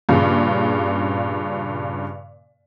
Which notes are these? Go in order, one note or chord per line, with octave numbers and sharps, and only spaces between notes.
G2 A#2 C#3